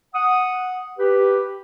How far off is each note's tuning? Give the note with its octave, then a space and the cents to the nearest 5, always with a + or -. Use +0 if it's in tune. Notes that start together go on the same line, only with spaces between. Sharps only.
F#5 -5 D#6 +0
G4 +0 B4 +0